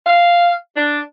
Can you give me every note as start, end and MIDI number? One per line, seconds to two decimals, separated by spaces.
0.06 0.53 77
0.77 1.00 62